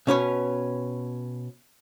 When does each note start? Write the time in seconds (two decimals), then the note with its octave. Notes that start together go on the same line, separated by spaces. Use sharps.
0.07 B2 C#4 B4 C#5